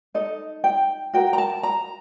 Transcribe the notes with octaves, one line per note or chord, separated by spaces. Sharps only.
D#4 A4 D#5
G5
F#4 A#4 G5
A#5
A5
A#5